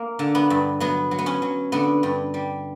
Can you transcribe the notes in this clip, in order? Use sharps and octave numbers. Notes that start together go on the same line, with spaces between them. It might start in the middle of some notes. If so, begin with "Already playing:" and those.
Already playing: A#3
D3
B3
G2
F#3 B3
F#3
B3
C#4
F#3
D3 B3
G2
G3